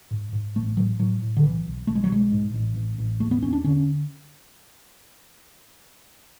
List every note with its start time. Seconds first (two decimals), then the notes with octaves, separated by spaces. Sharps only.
0.11 G#2
0.33 G#2
0.56 A1 A3
0.77 A2 F#3
0.99 A2 F#3
1.22 A2
1.37 D3
1.43 B1 E3
1.66 B1
1.87 B1 A3
1.95 G#3
2.04 F#3
2.09 B2 G#3
2.32 G#2
2.54 A1
2.76 A1
2.98 A1
3.20 E2 A3
3.31 B3
3.42 E2 C#4
3.53 D4
3.64 D3 C#4